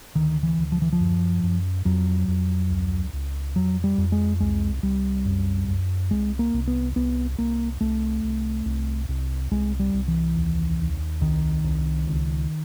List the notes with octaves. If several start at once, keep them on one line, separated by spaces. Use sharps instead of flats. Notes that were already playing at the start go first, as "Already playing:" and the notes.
D2 D#3
E3
D2
F3
E3
F3
F#2
F#2
F2 F#3
F2
C#2
C#2
F2 F#3
G3
F2
G#3
C2 G#3
C2 G3
F#2
F#2
C2 G#3
A#3
C2
B3
C2 B3
C2 A#3
C2 A3
C2
C2
C2
C2 G#3
G3
C2
E3
D#2
D#2
C2 D#3
C2
C#2